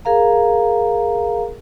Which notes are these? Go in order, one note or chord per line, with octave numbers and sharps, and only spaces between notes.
G#4 A#4 F5 A#5